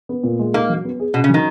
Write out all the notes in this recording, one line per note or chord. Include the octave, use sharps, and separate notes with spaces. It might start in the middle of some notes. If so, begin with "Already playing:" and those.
B3
A#2
G#3
A#3 D#4
F#3
B3
G#4
B2 C#4
C#3
D#3 F#3